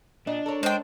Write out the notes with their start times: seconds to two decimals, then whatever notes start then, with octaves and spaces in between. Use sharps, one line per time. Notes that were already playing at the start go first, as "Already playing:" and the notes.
0.27 A#2 D4 D#5
0.46 A4 A#4 C#5
0.63 G#3 D4 C5 G5